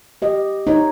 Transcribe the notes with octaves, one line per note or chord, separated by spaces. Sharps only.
G4 D#5
D#4 C#5